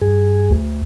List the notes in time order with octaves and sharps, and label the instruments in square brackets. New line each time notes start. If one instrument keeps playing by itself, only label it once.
[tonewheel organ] G2 G#4
[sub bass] D2